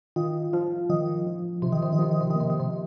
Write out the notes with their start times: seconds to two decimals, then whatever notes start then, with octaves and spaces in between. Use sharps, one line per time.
0.16 D#3 F4
0.53 F3 F4
0.89 D#3 F3
1.27 F3
1.62 C3 F3
1.72 D#3
1.83 C3
1.93 D#3
1.99 C3 F3
2.11 D#3
2.21 C3
2.30 D#3
2.35 C3 A#3
2.50 D#3
2.60 C3